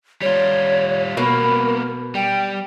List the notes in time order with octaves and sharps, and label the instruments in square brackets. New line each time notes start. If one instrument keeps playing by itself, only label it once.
[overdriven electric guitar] G3 F4 [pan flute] C#5
[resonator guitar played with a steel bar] B2 [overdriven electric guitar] A#3 B3 [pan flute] A#4
[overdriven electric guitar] G3 [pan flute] G5